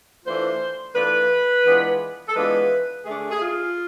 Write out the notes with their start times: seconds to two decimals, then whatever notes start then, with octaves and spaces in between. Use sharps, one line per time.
0.25 E3 A3 D4 F4 C5
0.95 E3 A3 D4 F4 B4
1.65 E3 G#3 B3 D4 F4
2.29 A4
2.36 E3 G#3 B3 D4 F4 B4
3.05 D3 A3 D4 G#4
3.31 G#4
3.41 F4